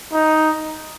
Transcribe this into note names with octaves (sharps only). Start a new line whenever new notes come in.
D#4